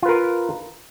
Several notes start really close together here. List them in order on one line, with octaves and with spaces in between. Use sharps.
F4 B4 A#4